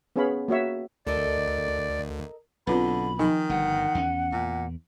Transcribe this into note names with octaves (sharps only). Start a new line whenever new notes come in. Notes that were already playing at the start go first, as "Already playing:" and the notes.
B3 C#4 G#4 C#5 F5 B5
A#3 F#4 C#5 E5
D2 A4 A#4 D5 D#5
B1 D3 C4 F4 B4 B5
D#3 F3 D#4 G#5
G1 G2 F#5
E2 C#4
E2 A#2